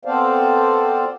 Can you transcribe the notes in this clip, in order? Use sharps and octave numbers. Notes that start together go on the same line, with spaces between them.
B3 C4 A4 C5 D5 F5